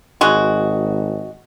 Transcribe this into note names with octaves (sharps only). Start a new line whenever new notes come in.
G#1 G#3 F#4